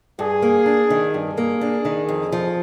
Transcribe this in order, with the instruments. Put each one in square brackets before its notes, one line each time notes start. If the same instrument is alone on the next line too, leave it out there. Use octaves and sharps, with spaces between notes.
[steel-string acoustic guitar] G2 [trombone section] G#4
[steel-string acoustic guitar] A#3
D4
D#3
[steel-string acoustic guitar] G2 [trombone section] G#4
[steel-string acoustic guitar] A#3
D4
D#3
F2
F3